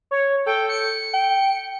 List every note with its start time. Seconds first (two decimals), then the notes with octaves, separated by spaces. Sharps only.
0.11 C#5
0.46 A4 G5
0.69 C#7
1.14 G5